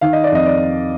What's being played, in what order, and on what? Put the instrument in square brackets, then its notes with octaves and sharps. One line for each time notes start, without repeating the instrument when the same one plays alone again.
[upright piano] D#3 F5
D#5
D5
F2 D#5
D5